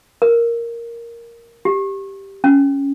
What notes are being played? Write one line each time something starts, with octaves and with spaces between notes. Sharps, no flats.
A#4
G4
C#4